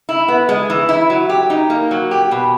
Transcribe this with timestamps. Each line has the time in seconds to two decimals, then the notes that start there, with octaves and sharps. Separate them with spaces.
0.09 E4
0.28 B3
0.49 G#3
0.70 E3
0.89 E4
1.10 F#3
1.29 G4
1.50 D#4
1.70 A#3
1.91 F#3
2.11 G4
2.31 B2